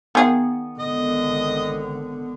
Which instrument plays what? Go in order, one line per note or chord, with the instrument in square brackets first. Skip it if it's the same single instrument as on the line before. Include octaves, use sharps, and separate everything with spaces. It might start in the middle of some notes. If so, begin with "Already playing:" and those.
[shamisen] D#3 G#4 F5 [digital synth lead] B3
[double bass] G#1 D3 [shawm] D#5